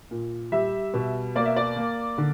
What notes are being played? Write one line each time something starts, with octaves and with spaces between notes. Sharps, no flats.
A#2
G3 E5
B2
A#3 D5
E5
D5
A#3
D3